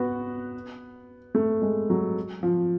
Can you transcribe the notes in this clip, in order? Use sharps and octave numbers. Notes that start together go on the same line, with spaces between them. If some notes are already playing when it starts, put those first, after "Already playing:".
Already playing: B3 F#4
A3
G#3
F#3
F3